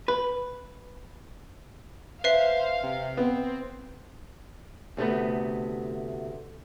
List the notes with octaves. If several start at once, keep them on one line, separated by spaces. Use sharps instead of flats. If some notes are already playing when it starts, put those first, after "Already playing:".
B4
B4 C5 E5 F5 C7
C3
B3 C4
D2 C3 A3 B3